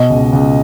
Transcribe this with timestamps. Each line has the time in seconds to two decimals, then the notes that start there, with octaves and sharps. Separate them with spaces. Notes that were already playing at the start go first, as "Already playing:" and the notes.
Already playing: B2 D#5
0.10 C#2
0.33 C#2